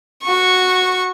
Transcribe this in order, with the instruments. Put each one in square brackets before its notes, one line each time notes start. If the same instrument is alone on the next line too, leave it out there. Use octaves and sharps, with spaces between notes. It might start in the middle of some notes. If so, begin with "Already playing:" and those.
[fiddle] F#4 C#6